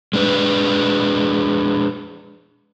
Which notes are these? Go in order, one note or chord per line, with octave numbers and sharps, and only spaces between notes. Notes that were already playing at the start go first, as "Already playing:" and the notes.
G#3 D4 B4